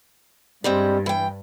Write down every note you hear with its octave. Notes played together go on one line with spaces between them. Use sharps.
G2 G3 G#3 C4
E3 G5